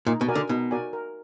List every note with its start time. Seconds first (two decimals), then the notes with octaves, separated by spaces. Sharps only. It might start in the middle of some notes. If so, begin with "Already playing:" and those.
0.07 A#2 D#4
0.21 B2
0.29 F#4 A#4 D5 G#5
0.35 D3
0.49 B2 D#4
0.71 F#4 A#4 D5 G#5
0.93 A#4